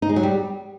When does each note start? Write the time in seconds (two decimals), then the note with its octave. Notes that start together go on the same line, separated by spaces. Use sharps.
0.02 D#4
0.09 G#3
0.16 F#3
0.23 G3